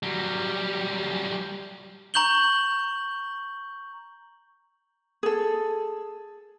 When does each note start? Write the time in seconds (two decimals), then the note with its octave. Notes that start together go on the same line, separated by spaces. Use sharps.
0.03 F#3 G3
2.14 A#5 C#6 G6 F#7 G7
5.23 G#4 A4